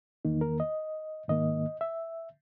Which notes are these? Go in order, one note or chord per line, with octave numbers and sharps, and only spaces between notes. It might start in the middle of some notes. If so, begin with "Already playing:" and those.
E2 D#3 A#3 D#4
A#4
D#5
G#2 D#3 A#3 D#5
E5